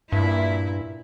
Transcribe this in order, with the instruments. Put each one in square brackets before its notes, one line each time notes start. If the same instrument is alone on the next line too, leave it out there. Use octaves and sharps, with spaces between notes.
[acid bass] G2 [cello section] A#2 E4